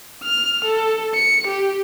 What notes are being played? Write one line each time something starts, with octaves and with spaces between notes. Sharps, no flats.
F6
A4
C#7
G4